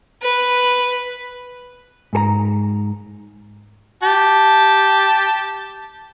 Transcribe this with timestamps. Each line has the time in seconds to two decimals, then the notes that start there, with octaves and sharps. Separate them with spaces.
0.22 B4
2.13 G#2 A4 A#5
4.03 G4 A5